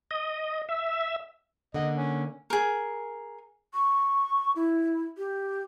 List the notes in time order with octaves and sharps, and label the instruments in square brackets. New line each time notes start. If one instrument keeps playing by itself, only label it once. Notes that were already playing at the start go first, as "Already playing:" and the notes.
[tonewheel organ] D#5
E5
[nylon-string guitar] D3 A#3 F#5 [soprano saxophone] D#5
[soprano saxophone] C#4
[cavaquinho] G#4 A#4
[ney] C#6
E4
G4